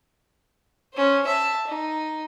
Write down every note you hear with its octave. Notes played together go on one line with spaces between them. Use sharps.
C#4 C5
E5 A5
D#4